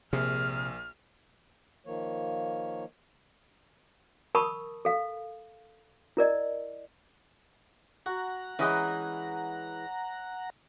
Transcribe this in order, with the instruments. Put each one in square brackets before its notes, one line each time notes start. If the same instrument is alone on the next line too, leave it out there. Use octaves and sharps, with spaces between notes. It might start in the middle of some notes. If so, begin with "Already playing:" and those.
[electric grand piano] A#1 A#3 G#4 [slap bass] C3 [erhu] F6
[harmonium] D#3 F3 A#3 C#5
[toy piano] A#4 A5 B5 C#6 D#6
A4 F5
E4 A#4 D5 D#5
[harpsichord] F#4 [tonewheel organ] F#5 A#5
[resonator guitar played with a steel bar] E3 G#3 [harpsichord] C#4 D#5 G5